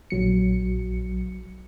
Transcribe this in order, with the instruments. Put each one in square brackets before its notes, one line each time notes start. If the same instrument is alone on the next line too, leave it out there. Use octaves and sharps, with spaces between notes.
[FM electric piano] A#1 F#3 C#7